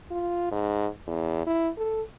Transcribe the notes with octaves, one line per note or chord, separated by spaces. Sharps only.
F4
G#2
E2
E4
A4